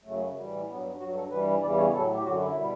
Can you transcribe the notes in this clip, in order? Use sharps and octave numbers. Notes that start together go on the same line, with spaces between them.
F#2 C#3 F#3 A3
A2 E3 G3
G2 F#3 B3
G2 F#3 F#4
A4
G2 E3 G3 B4
E2 C#3 E3 G3 D5
C#5
A2 F#3 A4
G4
F#2 D3 F#3 F#4
E4
B2 G3